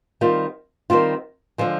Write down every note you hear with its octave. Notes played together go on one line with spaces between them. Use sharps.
D#3 G3 C4 F4
D#3 G3 C4 F4
D3 F3 G#3